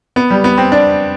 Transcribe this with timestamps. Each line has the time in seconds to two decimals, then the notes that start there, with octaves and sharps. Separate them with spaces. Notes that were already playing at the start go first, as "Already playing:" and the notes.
0.16 B3
0.30 G3
0.44 B3
0.58 C4
0.72 D4